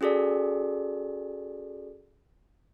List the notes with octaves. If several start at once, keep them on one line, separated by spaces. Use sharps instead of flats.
C#4 F#4 G#4 A4 D5